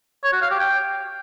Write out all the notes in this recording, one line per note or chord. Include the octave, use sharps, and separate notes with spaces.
C#5
F#4
F5
G4
G5